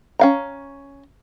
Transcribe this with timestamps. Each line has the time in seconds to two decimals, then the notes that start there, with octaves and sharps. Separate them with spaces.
0.19 C#4 F5 A#5